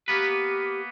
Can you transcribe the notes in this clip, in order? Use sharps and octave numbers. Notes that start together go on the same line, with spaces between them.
A#3 B3 G4 B4